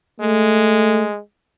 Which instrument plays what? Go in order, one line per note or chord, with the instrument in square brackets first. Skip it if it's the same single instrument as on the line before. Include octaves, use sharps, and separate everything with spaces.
[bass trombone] G#3 [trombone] A3